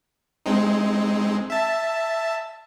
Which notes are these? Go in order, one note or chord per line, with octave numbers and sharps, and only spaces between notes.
G#3 C4 D#4
E5 A5